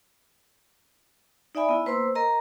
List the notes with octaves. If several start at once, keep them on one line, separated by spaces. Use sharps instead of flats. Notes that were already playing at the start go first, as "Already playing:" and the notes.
D#4 D5 E5 G#5 B5
B3 E4
A#3 B4 C5 C6 E6
A#4 D#5 A#5